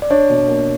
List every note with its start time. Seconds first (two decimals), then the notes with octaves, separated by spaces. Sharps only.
0.02 D5
0.10 D4 C#5
0.30 B2
0.48 A#3